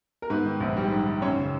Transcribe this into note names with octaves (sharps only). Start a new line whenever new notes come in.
A#4
G#2 B3 B4
D#3
A#1
G3
G#2
D#3
F#2 C#4 C#5
C#3